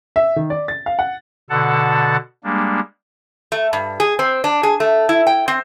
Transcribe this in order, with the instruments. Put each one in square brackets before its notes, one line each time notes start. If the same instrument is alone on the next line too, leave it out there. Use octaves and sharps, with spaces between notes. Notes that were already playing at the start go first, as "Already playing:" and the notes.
[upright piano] E5
D#3
D5
A6
F5
F#5
[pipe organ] B2 D3 A4 F#5 A5
G3 G#3 A#3 D4
[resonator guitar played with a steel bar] A3
G2
G#4
C4
D4
G#4
A3
E4
G5
C4